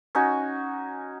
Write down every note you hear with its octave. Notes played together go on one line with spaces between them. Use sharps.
C#4 D#4 F#4 G#5